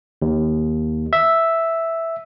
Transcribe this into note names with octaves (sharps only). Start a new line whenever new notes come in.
D#2
E5